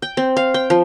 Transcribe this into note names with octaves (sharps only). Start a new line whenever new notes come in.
G5
C4
F5
G5
F3